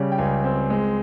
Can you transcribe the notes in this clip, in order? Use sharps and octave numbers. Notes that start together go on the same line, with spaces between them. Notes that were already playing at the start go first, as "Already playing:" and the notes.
Already playing: C#3 G3 C#5
G5
C#2 G#5
C4
G#3